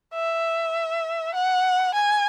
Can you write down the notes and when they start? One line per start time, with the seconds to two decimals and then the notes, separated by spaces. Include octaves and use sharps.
0.14 E5
1.34 F#5
1.94 G#5